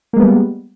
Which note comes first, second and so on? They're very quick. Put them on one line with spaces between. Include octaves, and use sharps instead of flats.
A#3 G#3 B3 G3